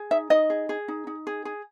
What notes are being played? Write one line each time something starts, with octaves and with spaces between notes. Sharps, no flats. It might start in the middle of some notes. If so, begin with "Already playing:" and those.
Already playing: G#4
D#4 E5
D#4 D#5
G#4
G#4
D#4
D#4
G#4
G#4